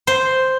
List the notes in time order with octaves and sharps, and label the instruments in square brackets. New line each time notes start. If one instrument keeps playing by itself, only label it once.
[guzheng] C5